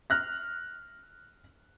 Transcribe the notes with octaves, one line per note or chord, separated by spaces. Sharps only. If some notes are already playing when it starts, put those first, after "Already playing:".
F6 F#6 A#6